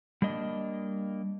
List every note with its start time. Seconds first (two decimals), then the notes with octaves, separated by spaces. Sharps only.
0.22 G3 A#3 D4 D#5